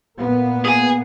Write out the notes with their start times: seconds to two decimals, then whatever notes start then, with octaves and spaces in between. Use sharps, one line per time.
0.18 A#2 A#3 B3
0.65 G#4 G#5